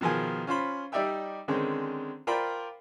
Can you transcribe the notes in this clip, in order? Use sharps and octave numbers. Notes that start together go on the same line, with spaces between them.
B2 D#3 F3 G#4 G#5
C#4 F4 C5 B5
G3 D#4 D5 E5 G5 E6
D3 D#3 G#3 C4 C#4
F4 A#4 C5 D5 G5 B5